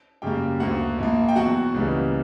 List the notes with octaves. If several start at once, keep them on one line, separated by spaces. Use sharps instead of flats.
F#2 C#3 G3 A#3 G4 G5
D2 D3 A#3 F#4 F#5
A#1 A#2 A#3
G5
E2 B2 F#3 F#4 F#5
C#2 C#3 E3 G3 A#3